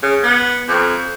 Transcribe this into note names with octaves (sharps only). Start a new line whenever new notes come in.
C#3
B3
F2